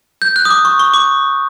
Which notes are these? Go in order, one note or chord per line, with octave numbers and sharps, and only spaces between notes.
G6
F#6
D#6
D6
C#6
C#6
D6